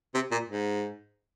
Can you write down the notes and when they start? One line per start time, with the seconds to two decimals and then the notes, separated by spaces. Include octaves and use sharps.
0.14 C3
0.31 A#2
0.50 G#2